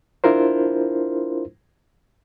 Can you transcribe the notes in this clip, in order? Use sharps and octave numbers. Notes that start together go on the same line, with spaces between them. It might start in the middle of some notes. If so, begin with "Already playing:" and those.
D4 E4 F4 A#4 C5